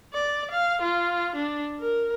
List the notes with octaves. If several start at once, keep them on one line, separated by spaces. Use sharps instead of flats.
D5
F5
F4
D4
A#4